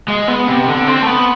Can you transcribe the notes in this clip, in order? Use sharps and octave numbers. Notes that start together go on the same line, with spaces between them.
G#3
B3
C3
D3
C4
A3
B3